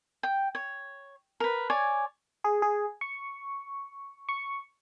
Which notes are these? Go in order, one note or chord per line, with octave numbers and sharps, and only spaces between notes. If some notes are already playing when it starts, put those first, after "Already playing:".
G5
C#5
A#4 B4
C#5 D5 G#5
G#4
G#4
C#6
C#6